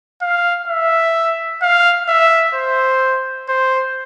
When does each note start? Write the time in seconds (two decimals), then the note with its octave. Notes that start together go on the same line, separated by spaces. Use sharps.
0.22 F5
0.68 E5
1.62 F5
2.08 E5
2.54 C5
3.49 C5